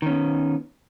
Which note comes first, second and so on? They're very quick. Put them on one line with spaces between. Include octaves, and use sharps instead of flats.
D#3 C#4 B3